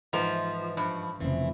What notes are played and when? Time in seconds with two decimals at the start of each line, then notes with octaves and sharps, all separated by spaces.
0.13 G#2 E3 F3 A#4 B4
0.77 G2 F3
1.20 F1 C#3 E3 F3 C4